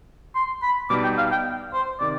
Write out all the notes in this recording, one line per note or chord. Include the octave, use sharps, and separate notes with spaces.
C6
B5
B2 G3 B3 D#4 D6
G5
F5
G5
C5
C3 D#3 D5